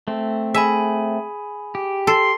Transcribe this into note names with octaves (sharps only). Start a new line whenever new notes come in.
A3 C4
G#4 E5 G#5 B5
G4
A4 C6